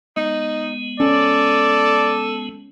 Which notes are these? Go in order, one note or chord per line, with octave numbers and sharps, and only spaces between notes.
G#3 B3 D#4
C#4 A4 D5